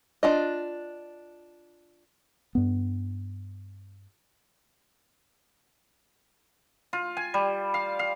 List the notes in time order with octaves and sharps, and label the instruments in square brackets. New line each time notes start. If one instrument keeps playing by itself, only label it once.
[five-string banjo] D4 F4 D#5
[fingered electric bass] G2 B3
[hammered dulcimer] F4
G#5
G3
F5
F5